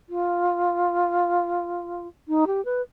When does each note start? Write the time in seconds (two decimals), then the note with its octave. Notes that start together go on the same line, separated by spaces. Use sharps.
0.09 F4
2.28 D#4
2.47 G4
2.65 B4